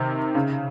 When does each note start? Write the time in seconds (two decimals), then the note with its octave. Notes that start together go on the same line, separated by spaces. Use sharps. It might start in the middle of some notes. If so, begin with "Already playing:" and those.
Already playing: C3 D#3
0.35 C#3